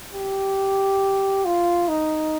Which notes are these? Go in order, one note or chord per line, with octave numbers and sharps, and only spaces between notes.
G4
F4
D#4